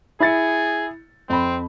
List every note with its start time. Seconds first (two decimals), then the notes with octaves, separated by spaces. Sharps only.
0.20 E4 G#4 A6 C#7
1.29 F2 C4 B5